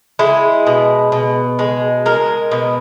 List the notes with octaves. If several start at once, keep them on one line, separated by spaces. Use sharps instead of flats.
G#3 E4
B2
B2
G#3
G#3 A#4
B2